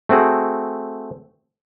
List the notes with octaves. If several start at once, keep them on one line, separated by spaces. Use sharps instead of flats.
A3 C4 F#4 G#4